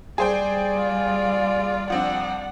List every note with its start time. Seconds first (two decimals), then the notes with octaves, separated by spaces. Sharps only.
0.18 G3 G#4 C5 D5 G5
0.75 F4
1.90 F3 C4 D4 F#5